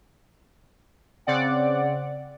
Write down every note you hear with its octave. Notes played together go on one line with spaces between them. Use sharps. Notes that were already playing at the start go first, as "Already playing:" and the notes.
C#3 C4 D5 F#5